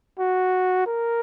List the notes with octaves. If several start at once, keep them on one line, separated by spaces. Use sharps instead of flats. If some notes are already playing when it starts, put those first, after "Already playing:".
F#4
A#4